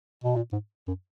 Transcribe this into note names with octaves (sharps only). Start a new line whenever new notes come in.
B2
A#2
G#2
F#2